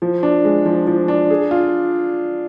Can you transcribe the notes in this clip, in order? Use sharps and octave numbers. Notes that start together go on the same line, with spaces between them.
F3
D4
G#3
F3
F3
D4
G#4
F4